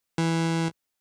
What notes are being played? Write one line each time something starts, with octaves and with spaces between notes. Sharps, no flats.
E3